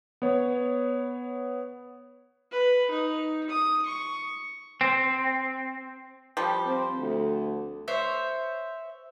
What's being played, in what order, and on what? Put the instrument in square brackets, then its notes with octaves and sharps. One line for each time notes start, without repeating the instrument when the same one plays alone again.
[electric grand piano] B3 C#5
[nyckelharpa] B4
D#4
D#6
C#6
[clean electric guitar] C4
[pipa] F3 G3 G4
[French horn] C4
D2
[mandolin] C5 C#5 E5